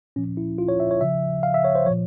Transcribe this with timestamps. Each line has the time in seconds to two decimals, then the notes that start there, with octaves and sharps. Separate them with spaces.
0.16 A#2 F3 C#4
0.37 E4
0.58 F4
0.69 C#5
0.80 E5
0.91 C#5
1.01 C#3 F3 E5
1.43 F5
1.54 E5
1.65 C#5
1.75 C5
1.86 F3 C#5
1.90 A#2